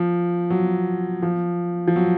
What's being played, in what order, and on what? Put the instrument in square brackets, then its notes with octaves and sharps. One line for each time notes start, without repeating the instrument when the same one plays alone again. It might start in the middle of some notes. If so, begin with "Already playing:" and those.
Already playing: [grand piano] F3
F#3
F3
F3
F#3